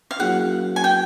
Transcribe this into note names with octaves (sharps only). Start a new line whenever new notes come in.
F5
F#3 A#3 C#4 E4 G#4 F#5
G#5
G5